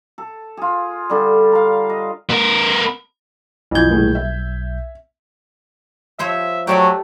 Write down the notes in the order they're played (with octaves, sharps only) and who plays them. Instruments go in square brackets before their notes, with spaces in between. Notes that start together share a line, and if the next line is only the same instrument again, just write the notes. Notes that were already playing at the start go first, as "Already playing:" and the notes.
[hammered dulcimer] A4
F4 G#4
D3 G3
F5 A#5
D#5
[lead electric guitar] B3 A#4
[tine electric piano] B1 G6 [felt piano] F2 E3 G#6
[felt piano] D#1 A2 G#4
E5
[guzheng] F3 C5 C#5 [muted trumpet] E5
[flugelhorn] F#3 [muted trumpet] A3 [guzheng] G4 A4 D5